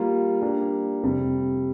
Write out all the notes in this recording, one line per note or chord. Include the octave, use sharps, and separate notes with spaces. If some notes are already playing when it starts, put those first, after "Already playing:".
Already playing: G3 A#3 F4
G3 A#3 D4
F2 C3 G3